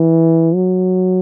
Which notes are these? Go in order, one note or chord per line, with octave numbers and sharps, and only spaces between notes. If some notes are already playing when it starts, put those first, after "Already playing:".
Already playing: E3
F#3